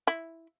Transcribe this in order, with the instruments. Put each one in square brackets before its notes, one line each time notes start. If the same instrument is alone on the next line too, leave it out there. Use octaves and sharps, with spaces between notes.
[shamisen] E4